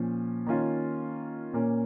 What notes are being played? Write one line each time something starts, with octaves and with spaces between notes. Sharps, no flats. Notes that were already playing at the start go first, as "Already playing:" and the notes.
Already playing: A#2 F3 C#4
D#3 A#3 C#4 F4
A#2 A#3 C#4